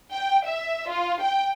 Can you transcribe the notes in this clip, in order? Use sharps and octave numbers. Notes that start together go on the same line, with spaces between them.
G5
E5
F4
G5